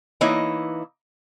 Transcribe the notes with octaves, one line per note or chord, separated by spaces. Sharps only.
E3 A#3 D#4 E4 C#5 D#5